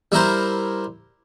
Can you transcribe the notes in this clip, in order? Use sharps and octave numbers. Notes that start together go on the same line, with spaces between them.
G3 E4 A#4 C5